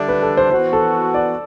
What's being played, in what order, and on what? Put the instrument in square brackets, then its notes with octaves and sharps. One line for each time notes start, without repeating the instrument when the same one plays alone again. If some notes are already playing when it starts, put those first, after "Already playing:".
Already playing: [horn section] D3 G3 D4 [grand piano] D5 E5
[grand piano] B4
A4
C5
[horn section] E3 B3 F#4 [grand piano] C5
[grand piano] A4
D5